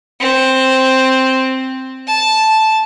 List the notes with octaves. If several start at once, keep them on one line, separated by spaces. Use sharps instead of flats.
C4
A5